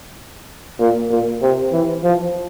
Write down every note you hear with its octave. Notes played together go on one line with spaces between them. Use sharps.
A#2
A#2
C3
E3
F3